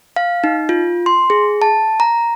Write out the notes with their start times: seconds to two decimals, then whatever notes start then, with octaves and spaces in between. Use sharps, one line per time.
0.16 F5
0.44 D#4
0.69 F4
1.06 C6
1.30 G#4
1.62 A5
2.00 A#5